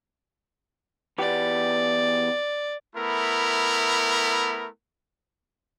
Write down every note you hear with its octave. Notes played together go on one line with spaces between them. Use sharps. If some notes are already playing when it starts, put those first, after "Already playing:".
E2 B3 G4 D5
A3 B3 E4 A#4